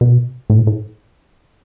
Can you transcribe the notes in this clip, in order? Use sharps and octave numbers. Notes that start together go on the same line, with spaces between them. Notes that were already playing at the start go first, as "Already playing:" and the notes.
B2
A2
A#2
A2